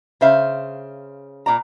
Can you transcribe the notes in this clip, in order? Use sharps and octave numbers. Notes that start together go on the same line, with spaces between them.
C#3 C5 E5 F5
A#2 D5 A#5